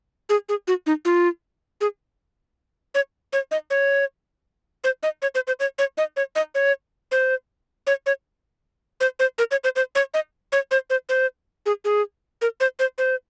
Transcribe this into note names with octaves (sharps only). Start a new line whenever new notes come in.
G#4
G#4
F#4
D#4
F4
G#4
C#5
C#5
D#5
C#5
C5
D#5
C#5
C5
C5
C#5
C#5
D#5
C#5
D#5
C#5
C5
C#5
C#5
C5
C5
A#4
C#5
C5
C5
C#5
D#5
C#5
C5
C5
C5
G#4
G#4
A#4
C5
C5
C5